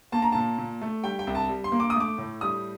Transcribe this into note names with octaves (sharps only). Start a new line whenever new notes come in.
A#3 A5
A#5
A#2 A5
A#2
A3
G3 G5
G5
C2
A5
G3
C6
A#3
D6
D#6
A3 D6
A2
G3 D#6